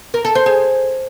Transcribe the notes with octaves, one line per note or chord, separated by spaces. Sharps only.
A#4
A4
C5
G#4